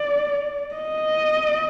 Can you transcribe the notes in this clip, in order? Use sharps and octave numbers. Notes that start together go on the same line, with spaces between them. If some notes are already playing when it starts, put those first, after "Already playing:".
Already playing: D5
D#5